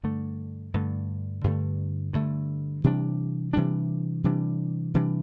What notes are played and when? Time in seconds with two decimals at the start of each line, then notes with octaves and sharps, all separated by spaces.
0.03 G2 D3 A3
0.74 G2 D3 A3
1.44 G2 D3 A3
2.13 G2 D3 A3
2.84 C3 E3 G3 D4
3.53 C3 E3 G3 D4
4.24 C3 E3 G3 D4
4.94 C3 E3 G3 D4